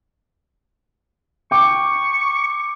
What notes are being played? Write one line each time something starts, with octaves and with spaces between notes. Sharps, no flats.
G5 C#6 D6